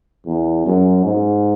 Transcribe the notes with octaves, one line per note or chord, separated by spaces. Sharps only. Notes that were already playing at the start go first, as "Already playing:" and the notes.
E2
F#2
G#2